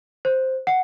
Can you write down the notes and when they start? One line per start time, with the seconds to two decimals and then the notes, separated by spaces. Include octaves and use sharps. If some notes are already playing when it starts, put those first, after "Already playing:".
0.25 C5
0.67 F#5